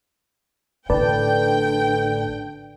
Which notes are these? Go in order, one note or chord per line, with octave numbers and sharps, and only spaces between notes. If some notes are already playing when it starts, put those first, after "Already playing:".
A1 A2 D3 B4 D5 G5 A5